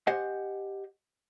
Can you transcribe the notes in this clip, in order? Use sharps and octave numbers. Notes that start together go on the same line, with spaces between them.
G4 C5 D#5 F#5 G#5